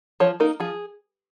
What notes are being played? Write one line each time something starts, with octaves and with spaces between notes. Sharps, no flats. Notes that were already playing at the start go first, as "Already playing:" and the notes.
F3 C#5
A#3 D#4 A#4
F3 G#4